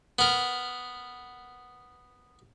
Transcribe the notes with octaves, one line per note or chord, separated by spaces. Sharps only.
B3 A#4